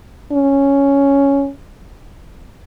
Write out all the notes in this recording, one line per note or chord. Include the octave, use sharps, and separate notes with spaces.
C#4